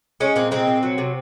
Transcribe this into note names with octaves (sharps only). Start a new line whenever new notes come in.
G#3 C#4
A#2 C4
G#3 C4
A#2
F#3
C3